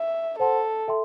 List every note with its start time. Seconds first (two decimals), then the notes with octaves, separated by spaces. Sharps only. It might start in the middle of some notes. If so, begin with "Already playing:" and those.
Already playing: E5
0.39 A4 C5 F#5 A5 C6
0.88 A4 E5 G5 C6